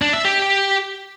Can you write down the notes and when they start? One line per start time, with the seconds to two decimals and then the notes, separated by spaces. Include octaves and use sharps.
0.02 D4
0.13 E5
0.25 G4